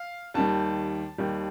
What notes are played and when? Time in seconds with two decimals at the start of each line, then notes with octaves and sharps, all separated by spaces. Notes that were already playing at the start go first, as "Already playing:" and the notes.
Already playing: F5
0.34 D#2 D#3 G3 A5
1.18 D#2 D#3 G3